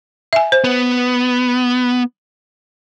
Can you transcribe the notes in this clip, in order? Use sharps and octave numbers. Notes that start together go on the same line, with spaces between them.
E5 G#5
C5
B3